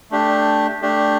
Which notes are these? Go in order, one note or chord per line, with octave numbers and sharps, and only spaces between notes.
A3 D4 G4
A3 D4 G4